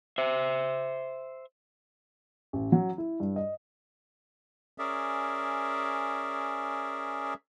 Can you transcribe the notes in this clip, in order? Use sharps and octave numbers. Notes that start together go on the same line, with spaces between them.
C5 E5
A1
F#3
E4
G2
D#5
C#4 G#4 A#4 D5 E5